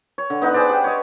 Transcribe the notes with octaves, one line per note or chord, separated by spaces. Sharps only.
C#5
D3
B3 D#4 F#5
G#4 B4 C5 D5
G4
C#5 D#5